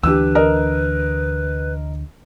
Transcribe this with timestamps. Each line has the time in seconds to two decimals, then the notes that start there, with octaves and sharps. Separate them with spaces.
0.03 D2 E3 D4 G4 B4 E6
0.35 A#4 D#5